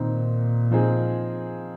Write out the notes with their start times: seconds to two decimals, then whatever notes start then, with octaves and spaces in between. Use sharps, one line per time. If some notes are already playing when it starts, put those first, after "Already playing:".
Already playing: A#2 D#3 C4 D#4
0.71 F3 C4 D#4 G#4